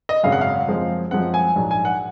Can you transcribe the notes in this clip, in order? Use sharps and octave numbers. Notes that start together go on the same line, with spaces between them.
D#5
G#1 F#2 C#3 G#3 F5
F#5
F5
F#2 F3 G#3 C4
F#2 F3 G#3 C4 F#5
G#5
A#1 G#2 F#3
G#5
F#5